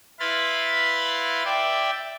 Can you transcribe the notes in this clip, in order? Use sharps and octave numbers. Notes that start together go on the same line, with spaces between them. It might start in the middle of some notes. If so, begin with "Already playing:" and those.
E4 B4 F5 B5 C6 A6
D5 E5 G5